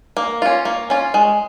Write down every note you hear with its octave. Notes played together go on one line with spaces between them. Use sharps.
A#3
C#4 F4
A#3
C#4 F4
G#3